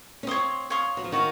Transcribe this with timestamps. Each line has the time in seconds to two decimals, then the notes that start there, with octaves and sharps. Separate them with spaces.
0.23 C#4
0.27 C4 C#5 F5 C6 D#6
0.70 C#5 F5 C6 D#6
0.97 F#3
1.04 F3
1.12 D#3 F#4 C#5 F5